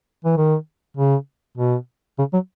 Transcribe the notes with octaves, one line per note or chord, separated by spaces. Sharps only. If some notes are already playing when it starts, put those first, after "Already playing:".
E3
D#3
C#3
B2
C#3
F#3